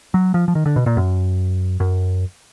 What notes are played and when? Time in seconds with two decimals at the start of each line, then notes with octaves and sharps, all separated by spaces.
0.14 F#3
0.34 F3
0.48 F3
0.55 D#3
0.66 D3
0.76 B2
0.86 A#2
0.97 F#2
1.80 F#2